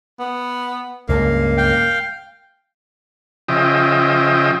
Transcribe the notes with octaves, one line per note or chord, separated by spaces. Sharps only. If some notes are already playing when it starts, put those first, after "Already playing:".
B3
C#2 G2 A#3
F5 G5
C#3 F3 D#5 E5 G5